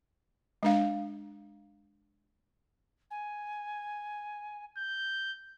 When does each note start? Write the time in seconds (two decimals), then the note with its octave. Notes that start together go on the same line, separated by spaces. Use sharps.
0.63 G#3 D4 F5
3.10 G#5
4.77 G6